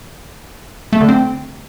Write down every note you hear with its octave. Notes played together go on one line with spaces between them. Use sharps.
A3
D3
C4